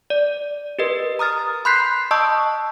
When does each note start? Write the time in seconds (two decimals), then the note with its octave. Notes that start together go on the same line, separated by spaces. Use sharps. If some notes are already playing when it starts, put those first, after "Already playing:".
0.10 D5
0.79 G4 A#4 B4 D#5
1.19 A#5 D#6 F6 A6
1.65 B5 C6 F#6 G6 B6 C7
2.11 D#5 A5 C#6 D#6 E6 G6